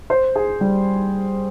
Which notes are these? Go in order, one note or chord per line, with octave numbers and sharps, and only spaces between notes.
C5
G#4
G3